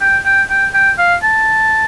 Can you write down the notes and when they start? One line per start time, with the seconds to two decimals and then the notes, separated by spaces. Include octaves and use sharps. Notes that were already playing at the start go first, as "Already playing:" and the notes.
0.01 G5
0.26 G5
0.50 G5
0.74 G5
0.99 F5
1.23 A5